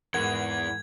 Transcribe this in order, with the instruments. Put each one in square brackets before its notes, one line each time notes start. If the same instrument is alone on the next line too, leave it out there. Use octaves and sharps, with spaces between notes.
[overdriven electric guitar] E2 [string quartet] G#2 [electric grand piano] A#4 F#5 [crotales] G#6